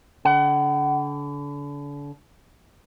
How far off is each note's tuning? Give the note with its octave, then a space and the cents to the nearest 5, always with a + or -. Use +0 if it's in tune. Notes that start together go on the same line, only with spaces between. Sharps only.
D3 -35 F#5 +35